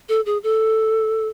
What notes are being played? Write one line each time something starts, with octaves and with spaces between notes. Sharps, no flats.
A4
G#4
A4